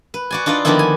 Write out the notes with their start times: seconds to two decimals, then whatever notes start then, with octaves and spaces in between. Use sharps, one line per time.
0.14 B4
0.30 F#4 D5 G#5
0.46 D4 D#4 F4 B4 D5
0.65 D3 D#3 F3 A#3 B3 E4
0.79 G#5